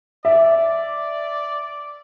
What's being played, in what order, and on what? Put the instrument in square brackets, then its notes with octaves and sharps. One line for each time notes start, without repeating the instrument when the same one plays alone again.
[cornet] D5 [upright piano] E5